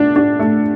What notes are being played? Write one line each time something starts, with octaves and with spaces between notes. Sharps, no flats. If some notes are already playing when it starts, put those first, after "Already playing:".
Already playing: A3 D4
D4
A3